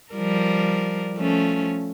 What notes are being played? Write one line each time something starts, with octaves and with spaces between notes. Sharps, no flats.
F3 G3 A#4
F3 A3 C#4